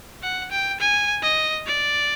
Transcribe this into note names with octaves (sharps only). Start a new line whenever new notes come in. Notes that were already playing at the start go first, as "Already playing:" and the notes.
F#5
G5
G#5
D#5
D5